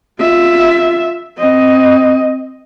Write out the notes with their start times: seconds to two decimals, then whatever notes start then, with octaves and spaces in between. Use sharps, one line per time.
0.20 F4 E5
1.38 C4 D#5